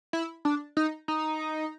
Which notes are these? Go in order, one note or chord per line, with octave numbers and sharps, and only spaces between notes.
E4
D4
D#4
D#4